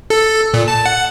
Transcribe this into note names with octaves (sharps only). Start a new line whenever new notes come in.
A4
A#2
A5
F#5